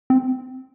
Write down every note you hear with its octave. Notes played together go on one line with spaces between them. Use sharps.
C4